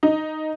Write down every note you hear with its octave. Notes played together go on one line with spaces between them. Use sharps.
D#4